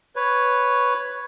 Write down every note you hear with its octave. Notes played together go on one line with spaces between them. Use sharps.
B4 C#5